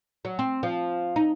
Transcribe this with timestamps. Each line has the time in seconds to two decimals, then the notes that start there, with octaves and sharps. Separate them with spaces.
0.25 F#3
0.39 C4
0.63 F3
1.16 D#4